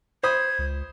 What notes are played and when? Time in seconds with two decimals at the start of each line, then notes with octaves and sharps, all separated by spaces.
0.23 C5 B5 D#6 G#6
0.58 C#2